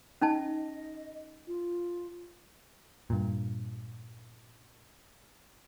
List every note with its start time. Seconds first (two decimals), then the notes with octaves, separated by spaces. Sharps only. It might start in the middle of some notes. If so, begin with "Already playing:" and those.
0.21 C#4 D#4 D#5 A5
1.47 F4
3.10 G2 A#2